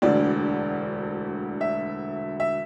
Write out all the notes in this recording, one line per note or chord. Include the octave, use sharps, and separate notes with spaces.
E1 D2 D3 D5
E5
E5